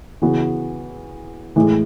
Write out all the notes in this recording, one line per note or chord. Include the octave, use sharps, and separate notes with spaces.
C#3 E3 B3 F#4
A2 E3 G#3